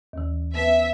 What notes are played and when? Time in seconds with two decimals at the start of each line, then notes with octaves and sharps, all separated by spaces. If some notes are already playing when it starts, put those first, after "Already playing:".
0.13 D#2 E3
0.55 B3 B4 E5